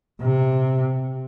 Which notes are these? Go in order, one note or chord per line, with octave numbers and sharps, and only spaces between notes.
C3